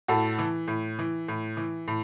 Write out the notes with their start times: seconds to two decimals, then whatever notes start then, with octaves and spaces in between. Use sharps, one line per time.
0.08 A2 F#4 A4
0.39 E3
0.68 A2
0.99 E3
1.28 A2
1.57 E3
1.88 A2